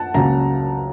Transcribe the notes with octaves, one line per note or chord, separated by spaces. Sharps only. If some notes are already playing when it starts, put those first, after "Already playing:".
Already playing: F#5 A5
C#2 C#3 F#3 A#3 C#4 A#5